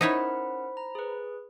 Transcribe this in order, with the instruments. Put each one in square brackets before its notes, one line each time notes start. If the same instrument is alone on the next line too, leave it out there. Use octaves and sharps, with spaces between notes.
[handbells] C#4 A#4 F#5 [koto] D#4 E4 C#5 [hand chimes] C5 B5
[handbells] A#5
G#4 B4